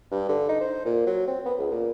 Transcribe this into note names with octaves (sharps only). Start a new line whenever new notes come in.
G2
D3
D#4
C5
A#2
F#3
C4
B3
C#2
A#2